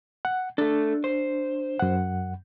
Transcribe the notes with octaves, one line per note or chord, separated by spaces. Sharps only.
F#5
A3 D4 A4
C5
F#2 F#5